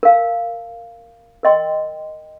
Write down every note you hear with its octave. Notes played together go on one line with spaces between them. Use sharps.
A#4 F5 A5
A#4 D#5 G5 C6